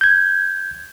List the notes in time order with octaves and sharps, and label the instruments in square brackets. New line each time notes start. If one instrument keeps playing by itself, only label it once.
[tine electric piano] G6 G#6